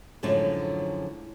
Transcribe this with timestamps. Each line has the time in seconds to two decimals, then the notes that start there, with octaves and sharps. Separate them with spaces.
0.23 F#2 A2 D3 F3 F#3 G#3